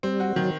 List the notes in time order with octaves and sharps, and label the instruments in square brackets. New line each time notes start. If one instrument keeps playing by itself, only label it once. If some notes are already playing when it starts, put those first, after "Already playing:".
[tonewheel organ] G3 [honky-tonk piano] C4
[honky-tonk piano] F#4
[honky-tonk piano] D#3 [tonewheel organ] F#3